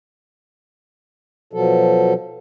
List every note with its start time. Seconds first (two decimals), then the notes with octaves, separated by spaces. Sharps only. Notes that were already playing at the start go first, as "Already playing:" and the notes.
1.53 B2 F3 F#3 A4